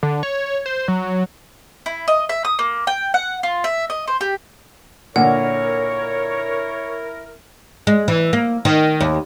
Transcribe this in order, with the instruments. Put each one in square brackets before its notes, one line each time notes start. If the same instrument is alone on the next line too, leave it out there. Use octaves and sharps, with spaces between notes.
[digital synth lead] D3
C#5
C5
F#3
[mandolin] E4
D#5
E5
D#6
A#3
G5
F#5
F4
E5
D#5
C5
G4
[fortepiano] A#2 D3 [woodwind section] E4 A#4 [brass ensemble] C#5 [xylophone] F#5
[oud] G#3
E3
A#3
D#3
D#2